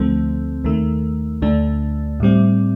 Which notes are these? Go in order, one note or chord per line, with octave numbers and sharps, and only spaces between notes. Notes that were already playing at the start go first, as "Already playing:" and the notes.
Already playing: D2 D3 F3 A3 C4
D#2 D#3 A3
D2 D3 A3 D4
A2 G3 C4